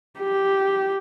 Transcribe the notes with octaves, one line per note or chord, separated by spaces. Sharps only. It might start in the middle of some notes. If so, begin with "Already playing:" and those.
G4